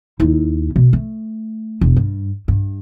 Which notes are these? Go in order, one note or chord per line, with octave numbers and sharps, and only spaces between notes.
D#2 E4
B2
A3
E1
G2
G2